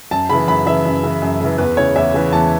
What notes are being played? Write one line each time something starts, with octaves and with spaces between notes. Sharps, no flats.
F#2 A5
C#3 E3 B5
F#2 B5
C#3 E3 E5
F#2
C#3 E3
F#2
C#3 E3
E2 B4
C#3 E3 C#5
E2 E5
C#3 E3
E2 A5